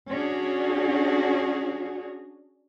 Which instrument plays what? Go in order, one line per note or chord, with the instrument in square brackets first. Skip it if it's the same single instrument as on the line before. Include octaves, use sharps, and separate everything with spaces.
[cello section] C#4 D4 F#4 G#4